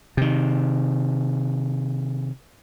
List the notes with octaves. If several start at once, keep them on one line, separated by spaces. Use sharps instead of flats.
C3 D#3